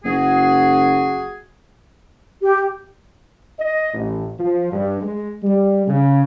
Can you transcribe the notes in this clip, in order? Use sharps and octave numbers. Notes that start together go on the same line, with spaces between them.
F#1 F#4 G#4
G4
D#5
A1
F3
G2
G#3
G3
C#3